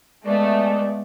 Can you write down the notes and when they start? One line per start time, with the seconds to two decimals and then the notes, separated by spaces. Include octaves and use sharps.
0.25 G#3 A3 B3 D5